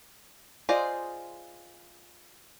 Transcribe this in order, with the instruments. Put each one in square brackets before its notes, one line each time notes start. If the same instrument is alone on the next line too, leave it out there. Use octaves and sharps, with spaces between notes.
[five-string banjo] F4 G#4 C5 D5 D#5